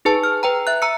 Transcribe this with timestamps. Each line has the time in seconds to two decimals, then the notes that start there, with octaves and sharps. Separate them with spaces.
0.05 D#4 G#4 B4 A5
0.24 F6
0.43 B4 G5 A#5
0.67 E5 F#6
0.82 A#5 E6 C#7